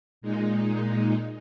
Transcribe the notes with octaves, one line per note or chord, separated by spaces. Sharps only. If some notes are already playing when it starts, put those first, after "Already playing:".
A#2 G#3 D#4